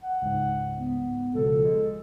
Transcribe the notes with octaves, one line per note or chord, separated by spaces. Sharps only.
F#5
C#2 G#2
B3
C#2 B2 F3 A4
G#3